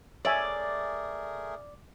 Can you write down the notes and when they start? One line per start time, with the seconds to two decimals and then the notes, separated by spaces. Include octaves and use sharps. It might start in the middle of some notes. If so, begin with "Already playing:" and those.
0.25 A3 G#4 A#4 C#5 D5 E5 G#5